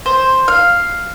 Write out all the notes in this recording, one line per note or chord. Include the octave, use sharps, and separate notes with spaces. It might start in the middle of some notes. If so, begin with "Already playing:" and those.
C5
F5